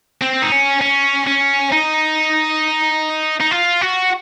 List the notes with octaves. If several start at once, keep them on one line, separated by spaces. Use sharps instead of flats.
C4
D#4
C#4
C#4
C#4
D#4
D#4
F4
F#4